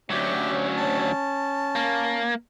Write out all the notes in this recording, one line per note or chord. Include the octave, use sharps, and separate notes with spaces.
D2 F#3 C#4 G4
A5
A#3